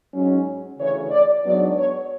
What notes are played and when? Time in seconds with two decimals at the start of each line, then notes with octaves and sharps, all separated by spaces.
0.13 G#2 F#3 C#4
0.79 D2 C#3 E3 C#5
1.11 D5
1.43 G#2 F#3 B3 D4 D5
1.76 C#5